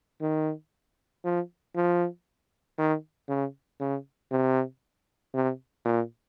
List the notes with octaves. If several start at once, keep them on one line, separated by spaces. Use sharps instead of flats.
D#3
F3
F3
D#3
C#3
C#3
C3
C3
A#2